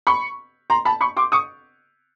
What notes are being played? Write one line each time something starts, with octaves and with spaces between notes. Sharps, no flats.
B5 C#6
A#5 C6
A5 B5
B5 C#6
C6 D6
C#6 D#6